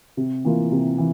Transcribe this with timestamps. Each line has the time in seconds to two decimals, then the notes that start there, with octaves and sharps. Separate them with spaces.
0.17 C3
0.45 E3 A#3 F4
0.72 C3
0.98 E3